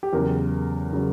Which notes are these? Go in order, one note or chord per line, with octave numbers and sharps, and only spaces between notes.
G4
E2 C#3 F#3 A#4
C#3 F#3